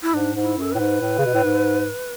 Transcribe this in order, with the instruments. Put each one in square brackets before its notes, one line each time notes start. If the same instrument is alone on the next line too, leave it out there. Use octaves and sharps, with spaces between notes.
[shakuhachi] E4
[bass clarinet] G#2 [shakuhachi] D4
[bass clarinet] G#2
[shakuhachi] E4
[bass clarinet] F#2 [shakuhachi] A4
[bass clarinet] A2 [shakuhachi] B4
[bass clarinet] G#2
A2
C#3
B2
A2
G#2